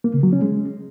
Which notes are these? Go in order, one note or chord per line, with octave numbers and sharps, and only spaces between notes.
A#3
C#3
F#3
C#4
G#3